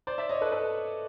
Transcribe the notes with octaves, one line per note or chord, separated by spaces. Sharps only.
C5 D5
D5 E5
C#5 D#5
A4 B4
A4 B4